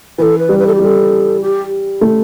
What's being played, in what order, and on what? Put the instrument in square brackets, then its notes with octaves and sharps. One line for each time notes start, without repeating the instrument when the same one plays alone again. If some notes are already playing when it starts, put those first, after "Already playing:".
[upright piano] E3 [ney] B4
[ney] A4
B4
[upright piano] G3
[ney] B4
A4
G4
[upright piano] G3 [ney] A4
[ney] G4
[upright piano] A3